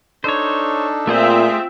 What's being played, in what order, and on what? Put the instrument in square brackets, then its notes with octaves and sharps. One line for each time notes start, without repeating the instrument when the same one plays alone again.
[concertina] D4 D#4 A4 [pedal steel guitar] C5 C#5
[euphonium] A#2 [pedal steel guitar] A3 G#4 C5 [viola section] C4 F4 E5